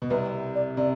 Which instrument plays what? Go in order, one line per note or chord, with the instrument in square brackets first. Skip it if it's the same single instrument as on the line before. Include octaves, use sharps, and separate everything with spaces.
[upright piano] B2
[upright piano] C2 C3 [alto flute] B4
[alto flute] D5
[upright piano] C3 [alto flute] D5